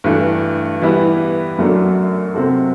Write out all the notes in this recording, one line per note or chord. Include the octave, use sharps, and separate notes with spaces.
G2 E3 A3
E3 G3 B3 E4 B4
F#2 F#3 A3 D4
C3 F#3 C4 F#4 A4